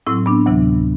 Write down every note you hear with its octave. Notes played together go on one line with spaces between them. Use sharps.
A2 F#3 C4 E4
B3 D4
D2 C3 E3 F#3